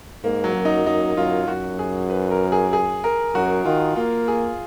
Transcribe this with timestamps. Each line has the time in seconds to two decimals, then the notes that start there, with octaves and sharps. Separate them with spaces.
0.23 G#2 A#3
0.44 F#3
0.55 F#2
0.65 D#4
0.86 F#2 D#4
1.17 F#2 F4
1.48 F#2 F#4
1.79 G#4
2.10 B4
2.31 A#4
2.52 G#4
2.73 G#4
3.04 A#4
3.34 F#2 F#4
3.65 D#3 F4
3.96 A#3 F4
4.28 G#4